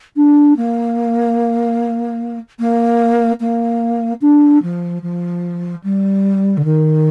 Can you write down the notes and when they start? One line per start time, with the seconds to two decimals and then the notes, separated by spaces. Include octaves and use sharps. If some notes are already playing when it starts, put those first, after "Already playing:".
0.16 D4
0.57 A#3
2.59 A#3
3.40 A#3
4.21 D4
4.62 F3
5.02 F3
5.83 G3
6.57 D3
6.64 D#3